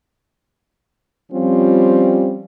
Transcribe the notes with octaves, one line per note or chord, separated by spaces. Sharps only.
F3 G3 C4 C#4 F4